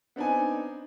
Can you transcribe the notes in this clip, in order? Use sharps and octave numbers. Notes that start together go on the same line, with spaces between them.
B3 C4 D4 D#4 G#5